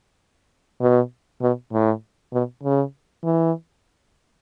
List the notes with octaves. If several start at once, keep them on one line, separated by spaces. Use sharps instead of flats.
B2
B2
A2
B2
C#3
E3